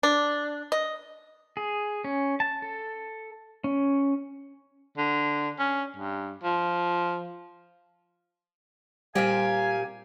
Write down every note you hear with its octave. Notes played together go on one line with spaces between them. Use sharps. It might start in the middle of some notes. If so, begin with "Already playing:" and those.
D4
D#5
G#4
C#4
A5
A4
C#4
D3
C#4
G2
F3
A#2 G3 C4 G4 F5 G#5